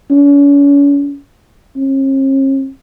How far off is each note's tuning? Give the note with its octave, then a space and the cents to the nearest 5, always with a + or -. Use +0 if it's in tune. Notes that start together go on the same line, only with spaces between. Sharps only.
C#4 +40
C#4 -45